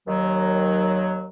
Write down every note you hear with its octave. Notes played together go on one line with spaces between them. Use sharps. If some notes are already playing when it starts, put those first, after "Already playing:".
D#2 D#3 F#3